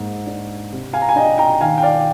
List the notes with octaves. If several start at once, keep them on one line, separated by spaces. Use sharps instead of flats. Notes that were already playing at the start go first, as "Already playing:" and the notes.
Already playing: G#2 A#3
D4
C3
F5 G#5
A#5
G#5
D4 D#5 G5
G5 A#5
D#3 F5 G#5
G5
D5 F5